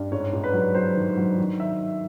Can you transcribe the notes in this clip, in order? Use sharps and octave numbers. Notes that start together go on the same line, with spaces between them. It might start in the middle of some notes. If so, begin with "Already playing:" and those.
Already playing: G2
G#2 C#5
G#2
B4
F#3
F#3 C5
D#3
F#3
D#3
E5